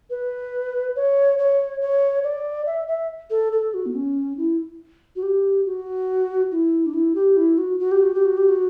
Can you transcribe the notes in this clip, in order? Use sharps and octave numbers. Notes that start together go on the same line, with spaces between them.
B4
C#5
C#5
C#5
D5
E5
E5
A4
A4
F#4
B3
C#4
E4
F#4
G4
F#4
E4
D4
E4
G4
E4
F#4
F#4
G4
F#4
G4
F#4
G4
F#4